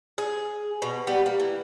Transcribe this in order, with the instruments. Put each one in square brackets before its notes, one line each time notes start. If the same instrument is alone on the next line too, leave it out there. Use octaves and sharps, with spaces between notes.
[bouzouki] G#4
B2
G3 B3 G4
A#3
E3